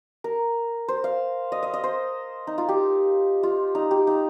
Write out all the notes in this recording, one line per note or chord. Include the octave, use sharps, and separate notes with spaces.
A#4
C5
F5
D#5
D#5
D#5
C5
D#4
F4
G4
F4
D#4
G4
D#4